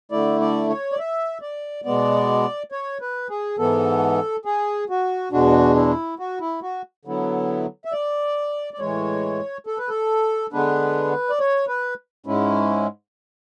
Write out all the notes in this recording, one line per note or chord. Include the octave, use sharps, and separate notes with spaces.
D3 A3 E4 D5
D5
C#5
D5
E5
D5
B2 G#3 B3 D5
C#5
B4
G#4
G#2 E3 B3 A4
G#4
F#4
E2 B2 G#3 D4 F#4
E4
F#4
E4
F#4
D3 F#3 B3 E4
E5
D5
D5
A2 E3 G#3 C#5
A4
B4
A4
D3 G#3 B3 D4 B4
D5
C#5
B4
G#2 G#3 C#4 E4